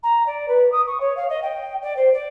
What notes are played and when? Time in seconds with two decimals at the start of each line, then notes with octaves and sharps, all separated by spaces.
0.03 A#5
0.26 D5
0.48 B4
0.71 D#6
0.86 C#6
1.00 C#5
1.16 F5
1.29 D#5
1.42 G5
1.82 D5
1.96 C5
2.13 D5